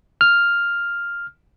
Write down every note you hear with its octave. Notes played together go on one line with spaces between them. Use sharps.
F6